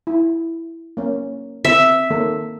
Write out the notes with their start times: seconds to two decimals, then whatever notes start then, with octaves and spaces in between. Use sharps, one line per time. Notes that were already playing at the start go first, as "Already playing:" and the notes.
0.07 E4
0.97 A#3 C#4
1.65 C4 E5
2.10 D#3 A#3 A4